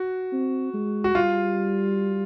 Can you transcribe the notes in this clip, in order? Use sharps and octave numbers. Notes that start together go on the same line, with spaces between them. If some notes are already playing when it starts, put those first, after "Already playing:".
Already playing: F#4
C4
G#3
F#4
G3 F4